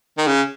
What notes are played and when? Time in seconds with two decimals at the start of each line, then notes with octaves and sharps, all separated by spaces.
0.18 D#3
0.27 C#3